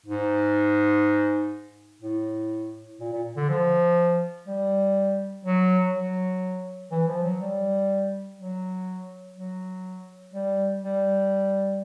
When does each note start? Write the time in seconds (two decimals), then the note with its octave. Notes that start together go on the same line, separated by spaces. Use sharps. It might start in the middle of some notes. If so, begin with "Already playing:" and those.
0.06 G#2
2.02 A2
3.00 A#2
3.13 A#2
3.36 D3
3.49 F3
4.48 G3
5.45 F#3
5.93 F#3
6.92 E3
7.08 F3
7.24 F#3
7.41 G3
8.38 F#3
9.36 F#3
10.34 G3
10.83 G3